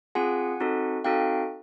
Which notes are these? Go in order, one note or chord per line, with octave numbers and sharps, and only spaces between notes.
C4 F4 G#4 F#5 G#5
C4 D#4 F#4 A4
C4 D#4 F#4 A4 F5 G5